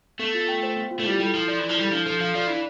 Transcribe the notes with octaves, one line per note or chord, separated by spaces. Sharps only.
A3 B3
F4
G5
C5
B3
F4
A3
G3 E4
G3 A4
F3 E4
F3 D5
E3 E4
F3
G3 A4
F3 D4
F3 A4
F3 F5
F3 D5
E3 D4